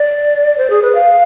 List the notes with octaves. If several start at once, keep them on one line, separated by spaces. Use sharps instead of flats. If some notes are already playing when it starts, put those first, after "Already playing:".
Already playing: D5
C5
G#4
B4
F5